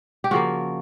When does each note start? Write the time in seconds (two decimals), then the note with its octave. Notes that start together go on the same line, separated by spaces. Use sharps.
0.24 G4
0.31 C#3 F3 A#3 F#4